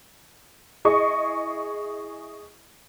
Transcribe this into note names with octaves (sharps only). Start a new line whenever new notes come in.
E4 G#4 D#5 C#6